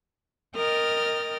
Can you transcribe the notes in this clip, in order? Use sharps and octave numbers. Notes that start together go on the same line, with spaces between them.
A#4 D#5 G5 D#6 F6 A6